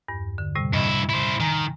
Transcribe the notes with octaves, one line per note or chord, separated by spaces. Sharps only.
E2 G2
D3
A2 C3 G3
G2 E4 D#5
E4 C5
D#3 G#5 A#5 D#6